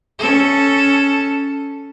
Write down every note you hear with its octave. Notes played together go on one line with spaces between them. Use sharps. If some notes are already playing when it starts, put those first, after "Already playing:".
C#4 A4